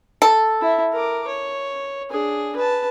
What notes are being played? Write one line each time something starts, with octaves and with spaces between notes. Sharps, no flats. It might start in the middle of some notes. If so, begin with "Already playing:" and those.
A4
E4 E5
A#4 D6
C#5
D4 G#4
B4 A5